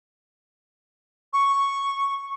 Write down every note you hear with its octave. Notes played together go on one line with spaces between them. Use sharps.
C#6